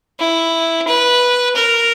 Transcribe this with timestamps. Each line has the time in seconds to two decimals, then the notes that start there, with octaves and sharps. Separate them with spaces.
0.19 E4
0.87 B4
1.56 A#4